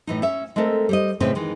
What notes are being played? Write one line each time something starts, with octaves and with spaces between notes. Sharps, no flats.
A2 E3 D#4
C#4 E5
G#3 A3 C4 A4 A#4
G3 C5 D#5
A2 C#3 G#3 C4 C#4 B4
D#3 E3 G#3